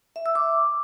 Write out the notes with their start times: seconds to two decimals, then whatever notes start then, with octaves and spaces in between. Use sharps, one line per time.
0.16 E5
0.26 E6
0.35 D6